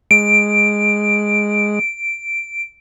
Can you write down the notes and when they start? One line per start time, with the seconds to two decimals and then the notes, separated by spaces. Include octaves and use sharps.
0.11 G#3 D7